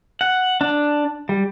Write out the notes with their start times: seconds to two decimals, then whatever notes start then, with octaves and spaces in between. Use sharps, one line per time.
0.21 F#5
0.61 D4
1.29 G3